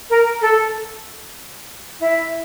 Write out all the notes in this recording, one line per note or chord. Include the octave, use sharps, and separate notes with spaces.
A#4
A4
E4